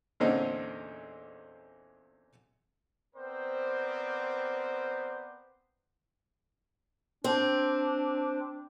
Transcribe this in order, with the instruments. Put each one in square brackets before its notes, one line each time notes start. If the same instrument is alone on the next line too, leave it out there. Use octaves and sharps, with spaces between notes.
[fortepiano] E2 A#2 D3 C4 C#4 D#4
[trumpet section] B3 C4 A#4 C5 D5
[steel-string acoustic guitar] C4 [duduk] D4